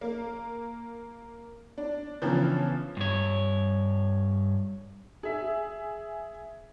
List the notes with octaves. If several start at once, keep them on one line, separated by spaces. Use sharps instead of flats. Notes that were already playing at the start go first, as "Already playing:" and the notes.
A#3
D4
C#3 E3 F3 B3 D4 B4
G2 C#5
G#4 E5